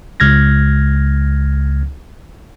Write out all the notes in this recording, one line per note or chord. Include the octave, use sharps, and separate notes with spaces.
C#2 F6 G#6 A#6